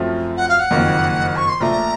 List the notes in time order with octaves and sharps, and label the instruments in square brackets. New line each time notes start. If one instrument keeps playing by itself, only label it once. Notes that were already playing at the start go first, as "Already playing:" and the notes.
Already playing: [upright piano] F#2 F3 A3 C4 F4
[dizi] F#5
F5
F#5
[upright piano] F#1 F2 D#3 A#3 F4
[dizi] C#6
C6
[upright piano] A#1 A#2 A3 [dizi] A#5